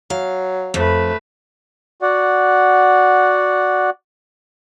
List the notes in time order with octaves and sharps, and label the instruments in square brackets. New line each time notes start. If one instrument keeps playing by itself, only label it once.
[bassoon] F#3 [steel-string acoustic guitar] F5
[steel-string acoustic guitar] F2 [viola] A3 B4
[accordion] F#4 D5 F#5